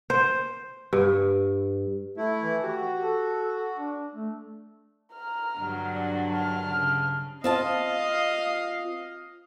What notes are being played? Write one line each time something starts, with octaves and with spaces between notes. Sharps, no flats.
C5
G2
A3 E4
E3
F#4 G4
A4
D4
A3
A#5 F6
G2 D3 F#3
D5
A5 F6
C#3
C4 F4 D#5 F5 A5